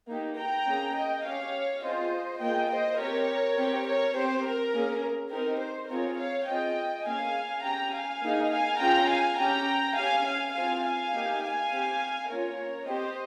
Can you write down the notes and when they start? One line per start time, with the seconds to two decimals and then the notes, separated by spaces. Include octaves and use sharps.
0.09 A#3 D#4 G4
0.38 G5 A#5
0.67 A#3 C#4 G#4
0.95 D#5 G5
1.24 C#4 G4 C#5 F5
1.82 C4 F4 G#4 C5 D#5
2.40 A#3 F4 G#4 D#5 G5
2.69 C5 D#5
2.99 C4 G4 A#4 C#5
3.57 C4 G4
3.86 A#4 C#5
4.15 C4 G4 C5
4.44 A#4
4.74 A#3 C#4 G#4
5.31 C4 D#4 G4 A#4
5.61 C5
5.89 C4 F4 G#4 A#4 C#5
6.18 C#5 F5
6.47 C4 F4 G#4 D#5 G5
7.06 A#3 C#4 G#4 F5 G#5
7.64 C#4 G4 G5 A#5
7.93 F5 G#5
8.22 A#3 D#4 G#4
8.51 F5 G#5
8.80 C#4 F4 G#4 G5 A#5
9.09 F5 G#5
9.39 C#4 G4 G5 A#5
9.96 C#4 G4 F5 G#5
10.25 F5 G#5
10.54 C4 F4 G#4 F5 G#5
10.84 F5 G#5
11.13 A#3 D#4 G4
11.42 F5 G#5
11.71 C4 G4
12.30 A#3 C#4 F4 A#4 C#5
12.87 C4 G4 C5 D#5